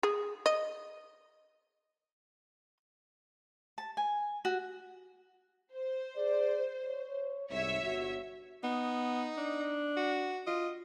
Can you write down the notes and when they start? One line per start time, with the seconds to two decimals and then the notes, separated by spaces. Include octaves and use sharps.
0.03 G#4
0.46 D#5
3.78 A5
3.97 G#5
4.45 F#4
5.73 C5
6.16 G#4 D5
6.84 C#5
7.50 C2 G#2 C#5 E5
7.83 G1 F#4
8.64 B3 D#4
9.38 D4
9.97 F#4
10.47 F4 D#5